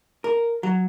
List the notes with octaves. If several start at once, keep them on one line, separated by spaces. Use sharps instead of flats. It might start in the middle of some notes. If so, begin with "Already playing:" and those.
A#4
F#3